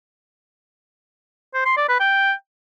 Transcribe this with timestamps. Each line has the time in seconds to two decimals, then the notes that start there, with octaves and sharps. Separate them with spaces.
1.54 C5
1.66 C6
1.77 D5
1.89 B4
2.00 G5